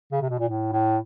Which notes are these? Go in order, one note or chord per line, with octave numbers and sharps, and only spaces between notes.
C#3
C3
B2
A#2
A2
A2